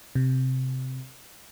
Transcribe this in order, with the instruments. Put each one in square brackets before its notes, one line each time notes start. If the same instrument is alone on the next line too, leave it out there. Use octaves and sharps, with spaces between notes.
[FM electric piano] C3